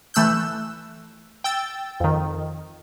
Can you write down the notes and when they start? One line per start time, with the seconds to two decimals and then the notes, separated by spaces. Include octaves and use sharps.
0.14 E3 A3 E6 F#6 G6
1.44 G5 E6 A6
2.00 F2 D#3